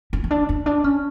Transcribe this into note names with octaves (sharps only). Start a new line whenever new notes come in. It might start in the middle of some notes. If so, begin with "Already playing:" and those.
C#4
C#4
D4
C#4
D4
C#4